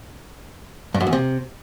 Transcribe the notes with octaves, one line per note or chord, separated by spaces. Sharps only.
G2
F#2
E2
C3